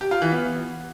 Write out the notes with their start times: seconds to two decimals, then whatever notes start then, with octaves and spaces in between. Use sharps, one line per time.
0.01 G4
0.11 F4
0.22 E3
0.32 B3